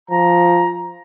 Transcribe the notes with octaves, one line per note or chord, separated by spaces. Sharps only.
F3 A#5